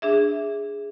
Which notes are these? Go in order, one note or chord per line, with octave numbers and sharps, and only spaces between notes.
D4 G#4 E5